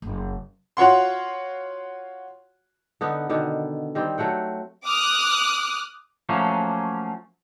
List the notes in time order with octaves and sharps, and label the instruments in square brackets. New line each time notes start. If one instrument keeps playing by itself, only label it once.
[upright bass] F#1
[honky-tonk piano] F4 F#4 C#5 F#5 C6
[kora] D3 B3 D#4
B2 D3 D#3
D#3 G3 C4
F#3 A3 F#5 G5
[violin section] D6 D#6 F6 F#6
[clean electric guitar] F3 F#3 A3 A#3 C#4